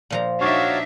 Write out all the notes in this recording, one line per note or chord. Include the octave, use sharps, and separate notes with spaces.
A#2 F3 A#5
D4 D#4 F#4 C#5 E5 F5